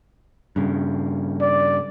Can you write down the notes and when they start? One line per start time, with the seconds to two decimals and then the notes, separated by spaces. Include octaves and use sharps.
0.56 G2 C#3
1.41 D5